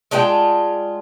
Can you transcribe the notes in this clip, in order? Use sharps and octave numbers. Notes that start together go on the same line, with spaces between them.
G#3 D4 F4 G5